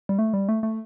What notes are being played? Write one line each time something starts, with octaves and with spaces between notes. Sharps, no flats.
G3
A3
G3
A3
A3